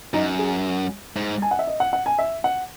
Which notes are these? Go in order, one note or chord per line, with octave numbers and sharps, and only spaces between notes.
F#2 D#4
G#4
G#2
G#5
F#5
E5
D#5
F#5
F#5
G#5
E5
F#5